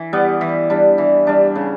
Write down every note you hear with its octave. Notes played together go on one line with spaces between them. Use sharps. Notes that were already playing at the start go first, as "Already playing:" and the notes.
Already playing: E3
G3 B3
E3
G3 D4
E3
G3 D4
C#3